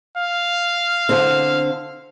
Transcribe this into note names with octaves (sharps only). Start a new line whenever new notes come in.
F5
D3 C4